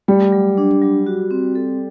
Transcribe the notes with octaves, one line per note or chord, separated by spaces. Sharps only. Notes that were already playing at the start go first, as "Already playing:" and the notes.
G3 A3
F#3
D4
F#3
F#4
C4
A4